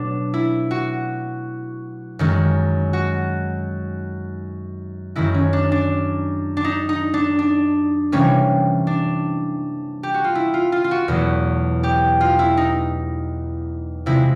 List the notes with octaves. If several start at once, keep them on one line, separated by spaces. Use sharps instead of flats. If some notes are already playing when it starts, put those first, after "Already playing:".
Already playing: B2 F#3 A3 D4
E4
F#4
F#2 D#3 G#3
F#4
F#2 D#3 G#3 E4
C#4
D4
D4
D4
D#4
D#4
D4
D4
C3 E3 G3 A#3 C#4
D4
G4
F#4
F4
E4
F4
F4
F4
F#4
E2 B2 F#3 A3
G4
F4
E4
D#4
C3 F3 G#3 E4